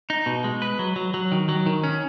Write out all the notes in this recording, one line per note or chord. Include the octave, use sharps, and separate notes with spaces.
D#4
B2
G#3
B4
F#3
F#3
F#3
D#3
F#3
D#3
C#4